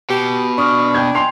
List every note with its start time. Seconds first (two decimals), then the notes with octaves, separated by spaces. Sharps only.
0.10 B2 G4
0.58 D4 C#6 D#6 F6
0.95 G5 G6 G#6
1.15 G5 G#5 C6 C7 F7